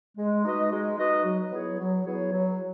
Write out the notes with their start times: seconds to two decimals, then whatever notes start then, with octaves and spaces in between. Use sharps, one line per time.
0.17 G#3
0.44 D#4 F#4 B4 D#5
0.71 G#3
0.98 D#4 F#4 B4 D#5
1.24 F#3
1.51 B3 E4 G#4 C#5
1.79 F#3
2.05 B3 E4 G#4 C#5
2.32 F#3